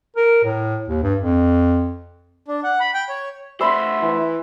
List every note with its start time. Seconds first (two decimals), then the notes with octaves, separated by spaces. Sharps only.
0.16 A#4
0.44 A2
0.89 D#2
1.03 G2
1.21 F2
2.48 D4
2.64 F#5
2.80 B5
2.94 G5
3.09 C#5
3.61 A3 C5 E5 B5 C6 E6
4.02 E3